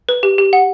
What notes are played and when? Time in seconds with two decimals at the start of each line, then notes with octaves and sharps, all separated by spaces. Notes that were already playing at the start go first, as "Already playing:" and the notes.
0.09 B4
0.23 G4
0.38 G4
0.53 F#5